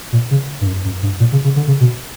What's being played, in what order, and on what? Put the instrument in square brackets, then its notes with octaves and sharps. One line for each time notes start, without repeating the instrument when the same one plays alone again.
[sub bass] A#2
C#3
G2
F#2
F#2
G2
A#2
C#3
C#3
D3
C#3
B2